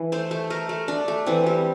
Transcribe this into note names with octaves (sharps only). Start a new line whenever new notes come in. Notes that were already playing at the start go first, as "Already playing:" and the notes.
Already playing: E3
A3 C5
A3
A3 A#4
A3
A3 D4
A3
E3 C4
G3 C4